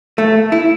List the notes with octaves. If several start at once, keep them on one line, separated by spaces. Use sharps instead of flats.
A3
E4